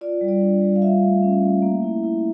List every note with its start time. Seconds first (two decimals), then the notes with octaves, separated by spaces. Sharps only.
0.01 F4 D5
0.21 G3
0.28 D5
0.42 D4
0.62 G3
0.76 F5
0.82 F4 E5
1.03 A3
1.23 C#4
1.43 A3
1.62 A#3
1.83 E4
2.03 E4